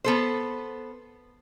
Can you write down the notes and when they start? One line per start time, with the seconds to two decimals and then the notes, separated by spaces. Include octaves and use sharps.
0.04 B3 A4 C5